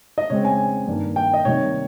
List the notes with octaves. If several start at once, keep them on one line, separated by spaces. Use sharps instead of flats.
D#5
C#3 G#3 C4 C#5
G#5
G2 D#3 A#3
G5
D#5
C3 D#3 G3 A#3 C#5